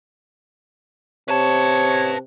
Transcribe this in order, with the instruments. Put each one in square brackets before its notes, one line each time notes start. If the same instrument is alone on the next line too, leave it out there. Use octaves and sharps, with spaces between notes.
[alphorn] C3 [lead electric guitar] B4 A5 [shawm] C#5